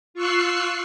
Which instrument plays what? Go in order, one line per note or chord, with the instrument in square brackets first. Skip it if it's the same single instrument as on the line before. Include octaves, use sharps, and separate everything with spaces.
[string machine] F4 C#6 E6 F#6 C7